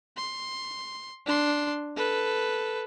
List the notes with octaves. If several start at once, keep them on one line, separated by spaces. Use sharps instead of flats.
C6
D4 C6
A4 B4